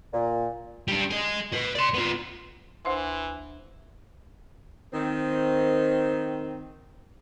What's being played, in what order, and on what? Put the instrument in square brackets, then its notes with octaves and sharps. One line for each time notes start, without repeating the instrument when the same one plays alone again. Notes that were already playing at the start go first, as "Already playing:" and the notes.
[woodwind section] A#2
[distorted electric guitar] G3 D4
G#4 D#5
B4 D#5
D5 C6
B3 F4
[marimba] D2 C5 C6 [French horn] E3
[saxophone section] D#3 C4